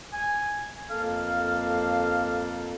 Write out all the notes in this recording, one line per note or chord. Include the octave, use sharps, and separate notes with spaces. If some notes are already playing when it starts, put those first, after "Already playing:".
G#5
F2 A#3 A4 F5